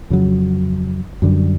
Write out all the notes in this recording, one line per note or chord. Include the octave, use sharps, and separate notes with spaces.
F2 C#3 F#3
F#2 D3 G3